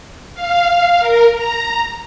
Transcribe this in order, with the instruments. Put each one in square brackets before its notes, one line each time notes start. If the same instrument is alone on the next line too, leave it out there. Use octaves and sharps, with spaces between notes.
[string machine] F5
A#4
A#5